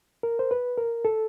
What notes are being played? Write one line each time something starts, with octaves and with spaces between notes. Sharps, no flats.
A#4
C5
B4
A#4
A4